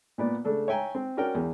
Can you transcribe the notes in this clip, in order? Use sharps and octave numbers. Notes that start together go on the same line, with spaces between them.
A#2 B3 D5
C#3 A3 D4 A4
C#5 E5 G5 G#5 A#5
C4
C#4 F#4 A#4 D5 G5
E2